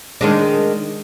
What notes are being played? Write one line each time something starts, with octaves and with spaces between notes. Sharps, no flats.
D#3 G#3 D4